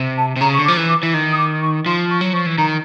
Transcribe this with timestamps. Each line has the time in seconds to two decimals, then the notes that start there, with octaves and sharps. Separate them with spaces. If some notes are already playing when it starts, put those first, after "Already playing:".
Already playing: C3
0.18 A5
0.36 C3
0.41 C#3 A#5
0.54 C#6
0.59 D3
0.65 D6
0.68 F3
0.77 E3
0.89 D6
1.03 E3
1.14 D#3
1.32 D#6
1.38 D6
1.62 C#6
1.86 F3 C6
2.11 C#6
2.21 F#3
2.33 F3 C#6
2.46 E3
2.58 D#3 A#5